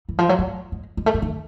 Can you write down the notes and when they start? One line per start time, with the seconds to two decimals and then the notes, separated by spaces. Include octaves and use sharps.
0.09 E3
0.19 F3
0.29 F#3
0.39 G3
0.72 G#3
0.97 G#3
1.06 A3
1.14 G#3
1.22 D#3